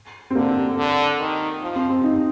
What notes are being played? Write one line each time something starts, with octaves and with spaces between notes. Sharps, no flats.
C4
D3 A#3
D3
D#3
F3
C4
C4
D#4